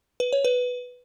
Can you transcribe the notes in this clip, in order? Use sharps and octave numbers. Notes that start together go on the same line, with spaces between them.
B4
C#5
B4